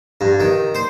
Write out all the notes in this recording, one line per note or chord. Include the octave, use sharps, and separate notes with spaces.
G2
D#3
C5